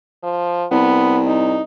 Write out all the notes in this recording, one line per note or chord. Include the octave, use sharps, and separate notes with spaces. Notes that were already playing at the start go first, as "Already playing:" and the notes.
F3
C2 B3
D#4